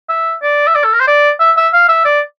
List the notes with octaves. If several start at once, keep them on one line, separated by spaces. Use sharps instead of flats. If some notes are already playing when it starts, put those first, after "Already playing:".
E5
D5
E5
D5
A4
A#4
C5
D5
E5
E5
F5
E5
D5